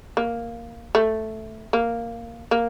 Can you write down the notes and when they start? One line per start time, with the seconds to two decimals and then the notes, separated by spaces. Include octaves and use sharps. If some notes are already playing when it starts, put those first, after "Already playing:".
0.17 A#3
0.95 A3
1.73 A#3
2.51 A#3